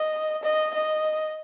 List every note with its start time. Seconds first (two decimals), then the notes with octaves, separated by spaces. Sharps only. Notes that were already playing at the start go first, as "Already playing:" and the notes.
Already playing: D#5
0.42 D#5
0.74 D#5